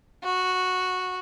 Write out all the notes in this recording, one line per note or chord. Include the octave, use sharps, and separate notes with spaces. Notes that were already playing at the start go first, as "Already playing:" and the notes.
F#4